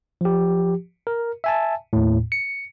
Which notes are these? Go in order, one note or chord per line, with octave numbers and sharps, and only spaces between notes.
F3 G4
A#4
E5 G#5 A5
D#2 A2
C#7